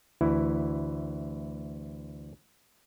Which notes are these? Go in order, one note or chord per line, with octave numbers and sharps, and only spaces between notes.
D2 E3 E4